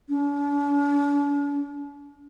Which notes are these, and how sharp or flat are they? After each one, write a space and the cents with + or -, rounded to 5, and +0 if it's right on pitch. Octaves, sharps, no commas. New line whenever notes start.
D4 -45